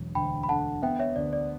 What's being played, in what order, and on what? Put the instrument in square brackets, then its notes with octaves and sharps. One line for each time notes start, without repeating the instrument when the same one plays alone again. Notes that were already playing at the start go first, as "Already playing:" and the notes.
Already playing: [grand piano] E1 F#3
[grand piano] D2 [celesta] G5 B5
[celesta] B5
[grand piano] D3 [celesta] F#5 A5
[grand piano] B3 [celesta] E5 G5
[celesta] C#5 E5
[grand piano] D2 [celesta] D5
[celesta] D5